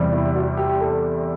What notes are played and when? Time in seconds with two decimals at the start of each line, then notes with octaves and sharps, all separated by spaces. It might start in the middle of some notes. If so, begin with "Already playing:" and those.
Already playing: E2 C3 G3
0.12 E4
0.35 F#4
0.57 G4
0.80 A4